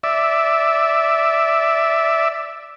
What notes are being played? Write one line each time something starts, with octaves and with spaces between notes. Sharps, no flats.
D5 E5